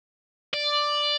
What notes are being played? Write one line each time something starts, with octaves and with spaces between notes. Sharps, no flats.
D5